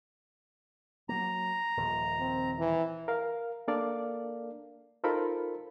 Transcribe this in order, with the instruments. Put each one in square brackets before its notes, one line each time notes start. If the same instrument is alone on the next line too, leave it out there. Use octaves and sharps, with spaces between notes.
[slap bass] F#3 A#3 [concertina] A#5
[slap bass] D#1 D#2 F3
[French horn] C4
E3
[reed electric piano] A#4 F5
A#3 D4 A4 A#4 D5 F5
D#4 F4 A4 A#4 C5 B5